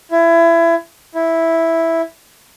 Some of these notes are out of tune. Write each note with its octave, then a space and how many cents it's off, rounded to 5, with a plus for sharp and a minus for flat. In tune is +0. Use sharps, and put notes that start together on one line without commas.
E4 +25
E4 -5